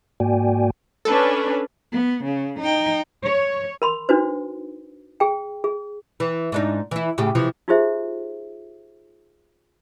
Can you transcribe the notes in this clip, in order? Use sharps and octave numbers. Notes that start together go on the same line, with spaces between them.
G#2 A#3 F#4 D5 G5 G#5
C#4 D4 A4 B4
B3
C#3
D#4 G5
C#5
A#4 B5 C6
D4 D#4 F#4 B4 C5
G#4 G5
G#4
E3
G#2 D4 D#4
E3 E4
A2 C#3 G4
C3 E3 F3
D#4 F4 G4 G#4 C5 E5